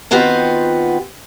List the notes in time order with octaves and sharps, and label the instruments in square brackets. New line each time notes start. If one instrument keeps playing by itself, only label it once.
[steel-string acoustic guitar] D#3 B3 C4 F4 F#4 G5